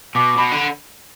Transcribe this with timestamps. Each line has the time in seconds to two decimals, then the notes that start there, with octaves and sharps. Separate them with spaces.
0.15 B2 D6
0.37 B2 B5
0.52 D3